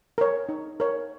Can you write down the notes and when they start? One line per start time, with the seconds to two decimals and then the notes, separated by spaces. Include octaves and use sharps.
0.18 A#4 C#5
0.49 D#4
0.80 A#4 C#5